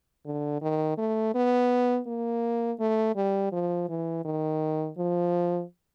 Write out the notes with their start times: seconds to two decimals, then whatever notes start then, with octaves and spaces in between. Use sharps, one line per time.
0.26 D3
0.62 D#3
0.98 A3
1.34 B3
2.07 A#3
2.80 A3
3.16 G3
3.52 F3
3.89 E3
4.25 D#3
4.98 F3